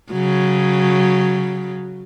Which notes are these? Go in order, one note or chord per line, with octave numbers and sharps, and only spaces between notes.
C#3 F#3